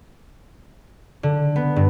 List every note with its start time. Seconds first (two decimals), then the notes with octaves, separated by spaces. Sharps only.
1.23 D3
1.56 B3
1.76 G2